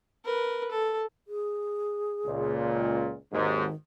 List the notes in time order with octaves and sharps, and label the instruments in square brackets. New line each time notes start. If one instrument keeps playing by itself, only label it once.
[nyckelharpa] A#4 B4
A4
[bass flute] G#4
[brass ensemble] C#2 A#2
[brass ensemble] G#1 D#2 G#2 [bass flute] D#3